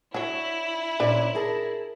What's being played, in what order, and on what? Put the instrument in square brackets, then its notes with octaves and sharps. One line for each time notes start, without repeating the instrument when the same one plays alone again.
[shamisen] F#3 C#5 [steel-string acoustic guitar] D4 [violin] E4
[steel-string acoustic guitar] A#2 C#4 [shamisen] D4 B4 C5
[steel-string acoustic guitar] G#4 A#4 A5